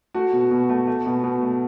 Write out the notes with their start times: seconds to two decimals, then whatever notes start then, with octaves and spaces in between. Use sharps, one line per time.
0.14 A3 F#4
0.33 B2
0.51 B2
0.69 A3
0.87 A3
1.06 B2
1.24 B2
1.43 A3